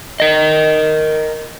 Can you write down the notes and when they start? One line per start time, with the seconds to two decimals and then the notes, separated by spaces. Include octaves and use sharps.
0.20 A#4 D#5